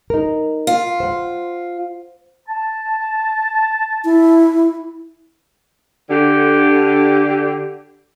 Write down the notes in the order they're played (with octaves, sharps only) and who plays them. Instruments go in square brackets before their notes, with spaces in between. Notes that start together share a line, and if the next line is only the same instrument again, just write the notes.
[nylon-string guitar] D#4 A#4
[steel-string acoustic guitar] F4
[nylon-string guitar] C5 F#5
[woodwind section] A5
[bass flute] E4
[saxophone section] D3 G4